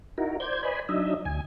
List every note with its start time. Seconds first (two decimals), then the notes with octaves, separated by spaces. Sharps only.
0.18 D#4 E4 F#4 A#4
0.40 C5 D5 G6 G#6
0.63 B4 C5 D5 D#5 G#5 B5
0.89 F#3 D4 D#4 D#5 E5
1.25 D2 G#5